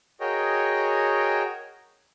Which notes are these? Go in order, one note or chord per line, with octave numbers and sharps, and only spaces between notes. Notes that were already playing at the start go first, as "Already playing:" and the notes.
F#4 G#4 A#4 C#5 D#5 G5